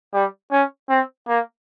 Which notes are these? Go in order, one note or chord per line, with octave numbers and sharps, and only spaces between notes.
G3
C#4
C4
A#3